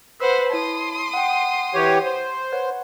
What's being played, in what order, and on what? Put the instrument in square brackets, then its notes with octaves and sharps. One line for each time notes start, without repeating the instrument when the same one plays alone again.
[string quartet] B4 C5 F#5 [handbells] E6
[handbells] E4 C#5 A5 [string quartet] C6 D#6
[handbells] F#5 G5
[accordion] E3 G4 C#5
C5
[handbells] B4 C#5 F#5